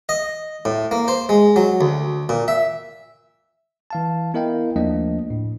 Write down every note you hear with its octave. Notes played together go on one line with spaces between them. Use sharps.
D#5
A2
A#3
C5
G#3
F#3
D2
A#2
E5
E3 F5 A5
B3 E4 A#4 D#5 F5 G5
D#2 F3 A3 A#3 D4 D#5
A2